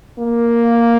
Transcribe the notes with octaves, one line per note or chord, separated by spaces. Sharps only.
A#3